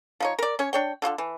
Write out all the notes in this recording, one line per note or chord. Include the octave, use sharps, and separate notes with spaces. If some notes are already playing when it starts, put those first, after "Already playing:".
F3 D#4 C#5
A#4 D5
C#4 C#5
D4 C#5 G5
D3 F4 F#4 A4
E3